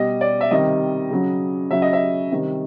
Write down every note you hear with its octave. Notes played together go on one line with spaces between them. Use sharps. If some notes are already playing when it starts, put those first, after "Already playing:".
Already playing: B2 G3 D#5
D5
E5
C3 D#3 G3 D#5
C#3 F#3
C#3 F#3 E5
D#5
E5
C3 D#3 G3